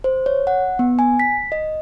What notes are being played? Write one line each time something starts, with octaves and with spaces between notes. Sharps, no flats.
C5
C#5
F#5
B3
G#5
B6
D#5